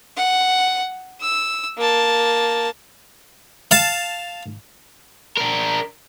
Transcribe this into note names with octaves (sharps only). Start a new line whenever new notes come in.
F#5
E6
A#3 A5
F5 A5
D4 A#4